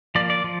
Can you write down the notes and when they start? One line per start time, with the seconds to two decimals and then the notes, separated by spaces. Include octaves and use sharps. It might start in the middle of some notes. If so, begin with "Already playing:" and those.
0.15 F3 A#3 D5
0.30 D5
0.44 F3